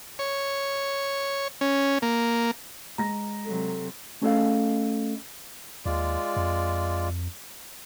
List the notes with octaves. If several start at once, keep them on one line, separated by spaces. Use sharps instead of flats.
C#5
C#4
A#3
G#3 A#5 A#6
C3 F#3 A4
A3 C#4 G#4 A4 D#5 F5
D#2 G#3 F4 D5
F2